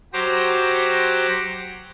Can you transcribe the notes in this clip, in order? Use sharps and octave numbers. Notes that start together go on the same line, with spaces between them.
F#3 F#4 G4 C5 A#5 D6